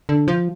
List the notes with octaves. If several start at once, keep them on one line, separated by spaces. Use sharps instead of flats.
D3
F3